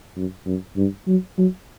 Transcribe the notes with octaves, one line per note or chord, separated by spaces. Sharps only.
F#2
F#2
G2
F#3
F#3